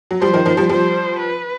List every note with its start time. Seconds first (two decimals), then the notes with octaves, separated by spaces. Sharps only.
0.11 F#3
0.21 F3 G3 C5
0.33 D#3 F3
0.46 D#3 F3
0.57 F3 G3
0.69 F3 G3 C5
1.19 B4